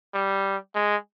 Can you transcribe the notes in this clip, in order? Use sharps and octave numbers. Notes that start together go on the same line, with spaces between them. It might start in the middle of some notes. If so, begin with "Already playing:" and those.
G3
G#3